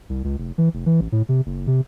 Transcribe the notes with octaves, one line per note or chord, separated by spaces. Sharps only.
C2
C#2
F1
E3
F1
E3
A1
A2
C3
F#1
C3